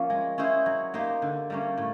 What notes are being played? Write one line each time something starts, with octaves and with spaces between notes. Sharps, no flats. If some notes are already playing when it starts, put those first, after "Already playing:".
Already playing: F3 A#3 C#4
G#3
C#4 E4 G#4 C5
F#3
A#3 D#4 G4 C5
D3
G3 A#3 C#4
A2